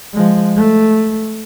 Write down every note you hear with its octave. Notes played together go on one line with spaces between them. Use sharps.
F3 G#3
A3